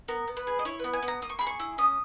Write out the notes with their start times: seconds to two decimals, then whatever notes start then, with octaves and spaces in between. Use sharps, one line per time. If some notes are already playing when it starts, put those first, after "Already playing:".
0.08 B3 A#4
0.28 B3
0.37 B4
0.47 G#4
0.59 D#5
0.65 E4 C#5
0.79 B3 B4
0.93 G#5
1.03 B3
1.08 A#5
1.22 A#3 D#6
1.30 C#6
1.39 G#4 B5
1.47 C#6
1.60 E4
1.78 C#4 D#6